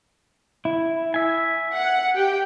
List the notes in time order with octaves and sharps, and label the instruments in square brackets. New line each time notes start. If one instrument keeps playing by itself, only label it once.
[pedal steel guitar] E4
E5 G#5
[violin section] F#5
G4 G5